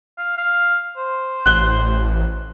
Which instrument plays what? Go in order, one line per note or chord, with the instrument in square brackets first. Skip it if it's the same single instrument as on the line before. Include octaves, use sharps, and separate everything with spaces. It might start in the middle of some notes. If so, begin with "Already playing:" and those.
[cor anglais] F5
F5
C5
[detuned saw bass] A1 [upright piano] F#6 G7